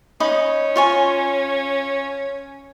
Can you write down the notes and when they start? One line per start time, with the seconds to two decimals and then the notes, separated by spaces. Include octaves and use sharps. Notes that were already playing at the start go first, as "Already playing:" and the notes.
0.20 C#4 D#4 B5 D#6
0.76 F4 C#5 G#5